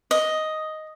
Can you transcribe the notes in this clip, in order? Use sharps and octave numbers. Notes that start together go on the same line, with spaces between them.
D#5